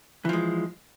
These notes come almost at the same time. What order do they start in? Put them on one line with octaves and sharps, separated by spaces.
E3 F3 G#3